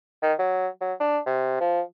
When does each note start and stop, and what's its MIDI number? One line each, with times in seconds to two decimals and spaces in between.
0.22 0.33 51
0.39 0.67 54
0.81 0.93 54
1.00 1.19 62
1.26 1.59 48
1.60 1.81 53